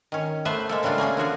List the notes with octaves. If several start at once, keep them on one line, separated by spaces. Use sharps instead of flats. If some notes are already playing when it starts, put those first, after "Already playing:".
D#3 C#4
A3 B3 B4 C5 E5
G#3 A#3 A4
C#3 G3 A3 D4 F4
A3 A#3 C#4 G#4
D3 F3 F#4 G#4